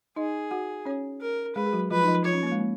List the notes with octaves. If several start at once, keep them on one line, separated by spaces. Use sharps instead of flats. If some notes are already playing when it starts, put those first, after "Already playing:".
D#4 G#4 D#5
F#4 F#5
C#4 C#5
A#4
G#3 G#4 B4
G#4
F#3 F#4
F3 F4 B4
D#4
F3 F4
F3 F4 C#5
C#4
A#3
G#3
A#3